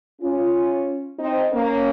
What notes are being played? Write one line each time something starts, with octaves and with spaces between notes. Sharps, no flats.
C#4 F4
C4 D#4
A#3 C#4